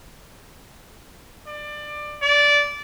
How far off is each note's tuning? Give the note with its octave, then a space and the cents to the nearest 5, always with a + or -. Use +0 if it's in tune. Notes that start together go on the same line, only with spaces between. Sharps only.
D5 +20
D5 -15